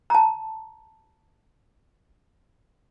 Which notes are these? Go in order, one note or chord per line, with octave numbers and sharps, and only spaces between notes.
A5 A#5